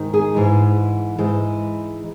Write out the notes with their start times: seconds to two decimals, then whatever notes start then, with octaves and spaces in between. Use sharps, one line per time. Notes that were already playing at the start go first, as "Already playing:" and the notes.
Already playing: G#2 D#3
0.14 G#4
0.35 G#2 E3 G#3
1.18 G#2 E3 G#3